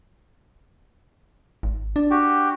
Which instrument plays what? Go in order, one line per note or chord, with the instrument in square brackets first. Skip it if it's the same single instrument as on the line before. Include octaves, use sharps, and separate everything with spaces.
[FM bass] G#1
D4
[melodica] F#4 G4 G5